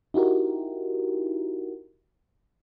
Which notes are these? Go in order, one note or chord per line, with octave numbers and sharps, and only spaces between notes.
D#4 E4 F#4 G4 A#4